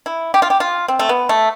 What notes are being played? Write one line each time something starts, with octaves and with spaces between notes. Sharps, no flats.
E4
G4
F4
G4
F4
C4
A3
B3
A3